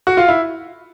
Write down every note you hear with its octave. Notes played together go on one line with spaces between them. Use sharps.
F#4
F4
E4